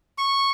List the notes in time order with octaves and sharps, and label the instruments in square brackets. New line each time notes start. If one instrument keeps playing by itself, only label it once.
[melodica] C#6